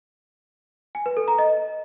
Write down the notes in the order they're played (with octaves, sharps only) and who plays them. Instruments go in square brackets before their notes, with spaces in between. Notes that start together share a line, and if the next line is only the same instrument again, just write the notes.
[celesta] G#5
B4
A4
A#5
D#5